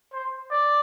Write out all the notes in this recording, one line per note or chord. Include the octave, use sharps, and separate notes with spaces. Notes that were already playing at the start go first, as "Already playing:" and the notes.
C5
D5